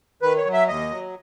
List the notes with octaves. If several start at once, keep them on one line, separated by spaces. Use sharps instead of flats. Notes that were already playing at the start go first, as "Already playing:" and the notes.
D#3 B4
C#5
F#3
E5
D#2 D#5
F#3